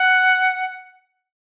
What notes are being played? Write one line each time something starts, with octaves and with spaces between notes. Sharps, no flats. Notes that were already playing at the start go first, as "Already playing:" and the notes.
Already playing: F#5